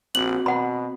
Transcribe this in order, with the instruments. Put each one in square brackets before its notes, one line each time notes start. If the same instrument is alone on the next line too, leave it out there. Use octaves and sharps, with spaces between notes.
[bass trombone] A#1 [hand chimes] C4 F#4 [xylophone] F#7
[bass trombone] B2 [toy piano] F#5 B5